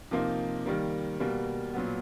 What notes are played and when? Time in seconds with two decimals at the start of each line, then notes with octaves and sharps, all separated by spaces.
0.11 C3 F3 A#3 D#4
0.66 D#3 G3 A#3
1.20 B2 G3 A#3
1.73 A#2 F#3 B3